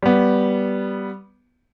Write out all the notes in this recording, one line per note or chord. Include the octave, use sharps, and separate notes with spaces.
G3 B3